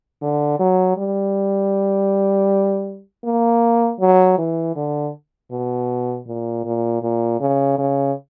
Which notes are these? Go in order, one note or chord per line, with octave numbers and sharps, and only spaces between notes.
D3
F#3
G3
A#3
F#3
E3
D3
B2
A#2
A#2
A#2
C#3
C#3